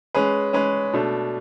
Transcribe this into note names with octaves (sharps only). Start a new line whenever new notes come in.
G#3 C#4 G#4 B4
G#3 C#4 G#4 B4
B2 A3 D4